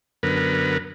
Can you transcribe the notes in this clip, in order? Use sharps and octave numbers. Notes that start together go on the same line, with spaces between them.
F#2 D3 B3 A#4 B4